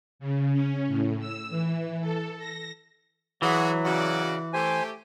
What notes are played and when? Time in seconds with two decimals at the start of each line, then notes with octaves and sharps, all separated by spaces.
0.19 C#3
0.52 C#4
0.87 A2
1.20 E6
1.50 E3
2.01 A4
2.39 A#6
3.42 E3 F#3 F#4 G#4
3.85 C#3 F#4 D5
4.53 A3 G4 C5 G#5